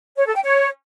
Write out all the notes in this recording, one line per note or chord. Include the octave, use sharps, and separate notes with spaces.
C#5
A4
G5
C#5